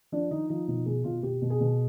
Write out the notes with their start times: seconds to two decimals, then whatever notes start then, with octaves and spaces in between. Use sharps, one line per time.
0.12 F3 D4
0.31 F3 D#4
0.49 F3 D#4
0.68 B2 D#4
0.86 B2 G#4
1.04 B2 F4
1.23 B2 G4
1.42 B2
1.50 G#4
1.60 B2